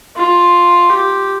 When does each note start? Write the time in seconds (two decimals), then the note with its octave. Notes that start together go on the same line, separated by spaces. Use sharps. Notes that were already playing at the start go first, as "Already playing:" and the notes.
0.17 F4
0.90 G4